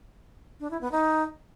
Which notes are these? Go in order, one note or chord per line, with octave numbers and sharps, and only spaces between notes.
D4
E4
B3
D#4